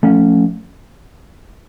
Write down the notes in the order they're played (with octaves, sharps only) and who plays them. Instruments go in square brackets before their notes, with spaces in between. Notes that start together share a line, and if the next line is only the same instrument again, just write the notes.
[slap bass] F3 A3 C#4